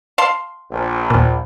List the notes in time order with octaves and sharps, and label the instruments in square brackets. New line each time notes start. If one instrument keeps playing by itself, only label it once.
[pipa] F5 A5 C6
[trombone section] A#1
[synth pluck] D#2 A#2